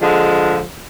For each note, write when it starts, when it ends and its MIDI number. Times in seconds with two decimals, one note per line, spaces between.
0.02 0.62 50
0.02 0.62 53
0.02 0.62 56